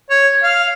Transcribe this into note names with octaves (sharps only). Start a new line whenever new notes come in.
C#5
F5